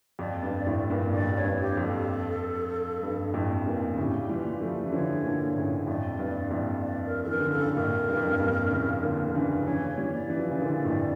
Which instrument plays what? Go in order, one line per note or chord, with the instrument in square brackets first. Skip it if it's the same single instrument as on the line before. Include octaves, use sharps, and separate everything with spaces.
[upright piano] F2 [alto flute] D5
[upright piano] G2
F2 A2
G2 A#2
[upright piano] F2 A2 [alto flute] D5
[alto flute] C#5
[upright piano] G2
[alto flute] G4
[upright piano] F2
[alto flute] A4
[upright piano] G2
F2 A2
G2 A#2
D3
[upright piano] A2 C#3 [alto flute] G4
[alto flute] G4
[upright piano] E3 G3 [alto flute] F4
[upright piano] F3 A3 [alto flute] E4
[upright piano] E3
[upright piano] D3 F3 [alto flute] C#5
[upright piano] A#2 D3
A2 C#3
[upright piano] F2 A2 [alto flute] D5
[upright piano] G2
F2 A2
[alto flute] D5
A#4
A4
[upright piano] E3 [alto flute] A#4
[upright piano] D3
[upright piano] C#3 [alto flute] A4
[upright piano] A#2
[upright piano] F2 A2 [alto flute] A#4
[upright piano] G2
F2
G2
G2 A#2
A2 C#3
A#2 D3
D3
C#3 E3
[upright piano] C#3 E3 [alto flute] C#5
[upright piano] E3 G3
[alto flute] D5
[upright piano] E3
F3
C#3 E3
[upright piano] A#2 D3 [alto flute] D5
[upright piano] F2 A2